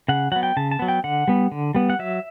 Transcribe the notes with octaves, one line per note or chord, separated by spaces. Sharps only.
C#3 F#5
F#3 B3 F#5
G5
C#3 A5
A5
F#3 B3
G5
D3 F#5
G3 B3
D3
G3 B3
F#5
F#3 E5